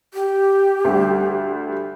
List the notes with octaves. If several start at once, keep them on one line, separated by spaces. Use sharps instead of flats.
G4
D2 G3